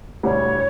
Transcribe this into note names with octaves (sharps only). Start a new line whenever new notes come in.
E1 D2 D3 G3 C#5